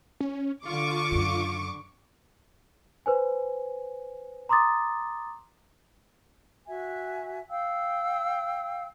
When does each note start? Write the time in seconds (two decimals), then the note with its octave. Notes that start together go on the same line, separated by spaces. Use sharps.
0.20 C#4
0.65 D3 F4 C#6 D6
1.12 F#2 C#3
3.06 B4 C5 G#5
4.49 A#5 C6 D6 D#6 A6
6.68 F#4 E5 G#5
7.50 F5 G5 E6